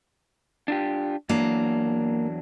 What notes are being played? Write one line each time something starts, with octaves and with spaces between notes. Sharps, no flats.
D4 F4 G4
E2 F#3 A#3 D4